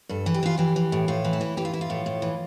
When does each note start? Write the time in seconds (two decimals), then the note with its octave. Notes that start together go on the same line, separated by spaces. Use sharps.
0.09 G2 A4
0.26 E3
0.34 G4
0.43 E3 F4
0.58 E3 G4
0.76 E3
0.92 A2
1.08 A2 F4
1.24 E3
1.33 E4
1.41 E3
1.57 E3 G4
1.65 F4
1.73 E3 E4
1.81 F4
1.90 A2
2.06 A2
2.22 E3